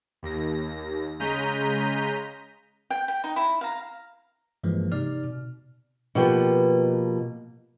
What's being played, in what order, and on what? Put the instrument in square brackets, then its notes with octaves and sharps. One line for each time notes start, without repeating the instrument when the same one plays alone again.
[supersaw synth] D#2 A#6
C#3 G#3 A#5 G6 B6 D#7
[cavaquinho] G5
G5
D#4
E4
F5 A#5
[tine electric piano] G2 E3 F3 G#3 A#3
C3 D#4 D5 F6
B2
[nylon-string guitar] B2 F3 A#3 B3 G4 G5